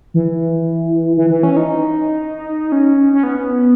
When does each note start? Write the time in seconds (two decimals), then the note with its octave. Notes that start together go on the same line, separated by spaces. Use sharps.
0.14 E3
1.17 E3
1.30 E3
1.43 C#4
1.57 D#4
2.72 C#4
3.13 C#4
3.23 B3